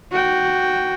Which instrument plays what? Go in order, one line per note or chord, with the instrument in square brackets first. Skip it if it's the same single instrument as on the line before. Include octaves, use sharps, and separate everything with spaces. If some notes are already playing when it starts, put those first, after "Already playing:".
[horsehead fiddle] F#4 G5